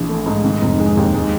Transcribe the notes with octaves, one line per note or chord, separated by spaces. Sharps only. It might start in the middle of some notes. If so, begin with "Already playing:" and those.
Already playing: A#1 E3 F3
A3
G#2
D#3
F1
G#3
D#2
G#3